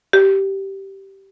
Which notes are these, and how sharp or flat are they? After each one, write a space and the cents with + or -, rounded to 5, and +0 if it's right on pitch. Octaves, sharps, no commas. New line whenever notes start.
G4 -10